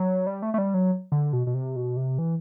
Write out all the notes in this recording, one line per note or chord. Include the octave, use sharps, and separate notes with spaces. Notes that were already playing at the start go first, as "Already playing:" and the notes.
Already playing: F#3
G3
A3
A3
G3
F#3
D3
B2
B2
C3
B2
C3
E3